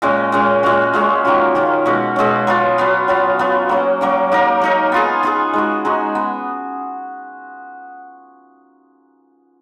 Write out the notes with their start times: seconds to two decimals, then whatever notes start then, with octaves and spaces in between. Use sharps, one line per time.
0.02 A#2 G#3 C#4
0.32 A#2 G#3 C#4
0.63 A#2 G#3 C#4 F#4
0.93 A#2 G#3 C#4 F#4
1.25 D#3 A#3 C#4 F4
1.55 D#3 A#3 C#4 F4
1.86 B2 G#3 C#4
2.16 B2 G#3 C#4
2.47 F#3 B3 F4
2.78 F#3 B3 F4
3.08 F#3 B3 F4
3.39 F#3 B3 F4
3.69 F#3 A#3 C#4
4.01 F#3 A#3 C#4
4.32 A#3 D#4 A#4
4.62 A#3 D#4 A#4
4.92 B3 F4 G#4
5.23 B3 F4 G#4
5.53 G#3 D#4 F#4
5.85 G#3 D#4 F#4
6.15 B3